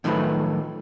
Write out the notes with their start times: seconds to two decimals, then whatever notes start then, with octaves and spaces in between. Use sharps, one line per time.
0.04 A2 D#3 F3 F#3 A3 B4